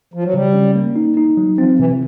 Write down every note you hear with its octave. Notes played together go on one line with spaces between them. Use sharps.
F3
F#3
C#3 G3
C#4
A#3
D#4
D#4
F#3
F3 C4
C3 E3